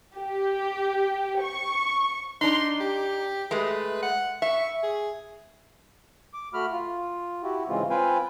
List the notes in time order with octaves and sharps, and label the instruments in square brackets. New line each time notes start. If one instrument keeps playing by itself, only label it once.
[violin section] G4
C#6
[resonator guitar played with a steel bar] D4 D#4 [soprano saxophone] C6
[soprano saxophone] G4
[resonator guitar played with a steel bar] G#3 A3 [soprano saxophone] B4
[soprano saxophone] F#5
[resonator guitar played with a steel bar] E5 [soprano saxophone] C#6
[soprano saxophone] G#4
[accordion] D6
A3 F#4 B5 F6
F4
E4 F#4 G4
G#2 C#3 E3 G#3 C4 F4
C4 F4 B4 F5 G5 G#5